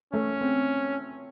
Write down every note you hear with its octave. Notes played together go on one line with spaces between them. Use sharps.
A3 C#4
C4